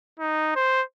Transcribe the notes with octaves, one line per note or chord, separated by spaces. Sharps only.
D#4
C5